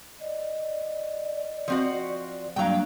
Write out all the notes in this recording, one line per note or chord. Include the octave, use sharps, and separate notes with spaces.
D5 D#5
F3 C4 F#4
G2 F#3 A#3 D4 F5 G5 A#5